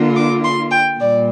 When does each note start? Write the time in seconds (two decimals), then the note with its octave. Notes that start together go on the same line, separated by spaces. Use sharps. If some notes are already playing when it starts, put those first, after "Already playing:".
Already playing: D3 A#3 F4
0.16 D6
0.44 C6
0.71 G5
1.00 A#2 G3 D5